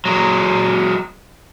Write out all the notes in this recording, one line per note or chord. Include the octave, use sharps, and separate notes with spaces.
F#3 G#3